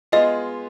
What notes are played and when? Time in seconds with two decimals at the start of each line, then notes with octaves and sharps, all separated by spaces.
0.12 G#3 B3 F4 G#4 D#5